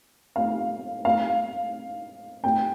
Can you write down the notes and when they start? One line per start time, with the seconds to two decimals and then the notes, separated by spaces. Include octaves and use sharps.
0.36 F5
1.05 F5
2.44 G5